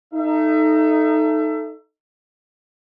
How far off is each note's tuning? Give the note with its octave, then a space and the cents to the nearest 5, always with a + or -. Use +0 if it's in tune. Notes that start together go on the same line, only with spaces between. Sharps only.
D#4 +0 A4 +0 E5 +30